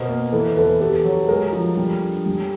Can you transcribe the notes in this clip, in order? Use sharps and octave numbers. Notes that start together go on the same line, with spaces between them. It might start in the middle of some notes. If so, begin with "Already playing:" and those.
Already playing: B2 A#4 C5
A#3
E3 A4 B4
E2 A4 B4
E2 G4 A4
F#3
G#3 G#4 A#4
F3
G3
D4
G3